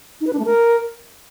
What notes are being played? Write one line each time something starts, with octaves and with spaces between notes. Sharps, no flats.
D#4
B4
D4
A3
A#4